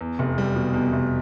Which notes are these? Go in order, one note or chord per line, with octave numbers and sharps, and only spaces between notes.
E2
F1
G3
B2
E2
F1